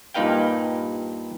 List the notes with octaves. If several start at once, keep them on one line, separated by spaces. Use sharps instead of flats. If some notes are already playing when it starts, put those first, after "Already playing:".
G2 A#2 D#4 B4 F5 G5